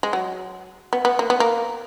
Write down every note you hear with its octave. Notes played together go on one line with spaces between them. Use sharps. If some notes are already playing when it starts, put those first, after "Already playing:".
G#3
F#3
B3
B3
A#3
B3
A#3